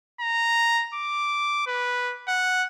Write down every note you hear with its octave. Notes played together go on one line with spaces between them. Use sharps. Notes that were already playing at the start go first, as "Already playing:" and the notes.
A#5
D6
B4
F#5